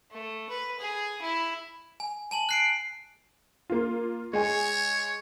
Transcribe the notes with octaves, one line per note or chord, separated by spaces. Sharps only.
A3
B4
G#4
E4
G#5
G#5 A5 F#7
F#6 C7 D7
A#3 F4
G#3 C#5 G#5